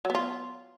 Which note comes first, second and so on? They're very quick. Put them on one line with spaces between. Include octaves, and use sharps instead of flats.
F#3 B3 F4